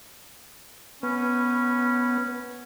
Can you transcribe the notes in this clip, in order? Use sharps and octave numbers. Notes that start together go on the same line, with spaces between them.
B3 C#4